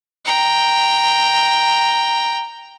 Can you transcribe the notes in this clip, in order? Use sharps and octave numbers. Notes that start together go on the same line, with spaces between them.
G5 A#5